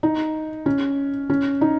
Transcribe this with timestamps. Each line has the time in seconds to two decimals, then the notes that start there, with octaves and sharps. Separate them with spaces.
0.03 D#4
0.66 C#4
1.30 C#4
1.61 D#4